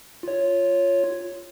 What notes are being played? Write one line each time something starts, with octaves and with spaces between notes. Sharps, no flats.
F4 C#5